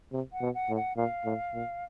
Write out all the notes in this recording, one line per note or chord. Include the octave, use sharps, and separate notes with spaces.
C3
F#5
B2
F#5
A2
F#5
A#2 F5
A2
A#2